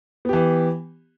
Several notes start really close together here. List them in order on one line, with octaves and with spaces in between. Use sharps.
B3 G4 E3